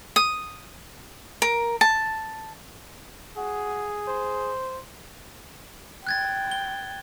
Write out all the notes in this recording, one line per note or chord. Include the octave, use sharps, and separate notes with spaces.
D#6
A#4
A5
F#4 G#4
C5
G5 F#6 G#6 A6
G7